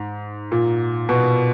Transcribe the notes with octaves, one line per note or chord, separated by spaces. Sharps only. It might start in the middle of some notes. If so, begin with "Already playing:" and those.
Already playing: G#2
A#2
B2